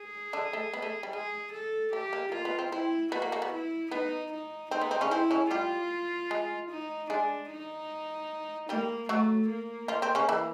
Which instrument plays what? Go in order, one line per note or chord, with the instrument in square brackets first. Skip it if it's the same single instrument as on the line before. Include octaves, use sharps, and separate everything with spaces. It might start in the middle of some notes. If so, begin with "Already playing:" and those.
Already playing: [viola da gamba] G#4
[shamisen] D3 D4
A3
B3
A3
G3
[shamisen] G#3 [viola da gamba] G#4
[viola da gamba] A4
[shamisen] A3 [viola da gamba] G4
[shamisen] A#3
[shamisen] A#3 [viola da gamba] F4
[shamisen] B3
C4
[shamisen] C4 [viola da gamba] E4
[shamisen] B3 [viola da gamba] F#4
[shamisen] A#3
A#3
B3
[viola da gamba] E4
[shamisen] B3 [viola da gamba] D#4
[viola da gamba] D#4
[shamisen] C4 [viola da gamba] D#4
[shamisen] B3
C4
C#3 C#4
[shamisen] C4 [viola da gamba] E4
[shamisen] C#3 C#4
[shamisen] G3 G4 [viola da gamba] F4
[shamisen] G#3 G#4
[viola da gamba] D#4
[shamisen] G#3 G#4 [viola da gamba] D4
[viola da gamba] D#4
[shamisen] G3 G4 [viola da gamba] A#3
[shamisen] F#3 F#4 [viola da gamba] A3
[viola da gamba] A#3
[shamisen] F3 F4
C4
C#3 C#4
E3 E4